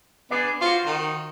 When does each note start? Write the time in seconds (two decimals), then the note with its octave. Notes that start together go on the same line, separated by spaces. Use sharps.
0.31 B3 D4 G#4 D5
0.61 F4 F#4 C5
0.86 D#3